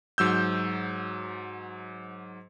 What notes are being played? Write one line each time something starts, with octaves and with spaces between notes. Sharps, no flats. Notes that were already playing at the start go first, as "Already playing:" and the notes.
G#2 F#3 E6 G6